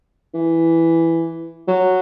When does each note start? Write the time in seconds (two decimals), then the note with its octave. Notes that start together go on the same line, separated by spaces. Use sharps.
0.34 E3
1.68 F#3